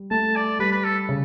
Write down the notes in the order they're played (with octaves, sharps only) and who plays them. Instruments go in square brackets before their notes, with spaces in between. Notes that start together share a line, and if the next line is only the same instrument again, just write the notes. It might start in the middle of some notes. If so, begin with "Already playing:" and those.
Already playing: [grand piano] G3
[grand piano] A3 [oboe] A5
[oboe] D5
[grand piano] G3 [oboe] B4
[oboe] B4
A4
[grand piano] C#3